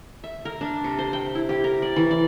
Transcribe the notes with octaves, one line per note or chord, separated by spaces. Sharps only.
E5
A#4
D4
C3
C5
G5
E4
G4
A#4
D5
E3
D5